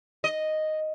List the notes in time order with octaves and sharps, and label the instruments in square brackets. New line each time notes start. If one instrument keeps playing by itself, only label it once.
[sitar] D#5